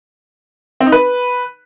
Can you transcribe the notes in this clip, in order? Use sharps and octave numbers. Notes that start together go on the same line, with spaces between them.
C4
D#4
B4